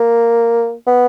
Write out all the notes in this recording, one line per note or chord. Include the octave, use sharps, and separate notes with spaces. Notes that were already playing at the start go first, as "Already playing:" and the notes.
Already playing: A#3
B3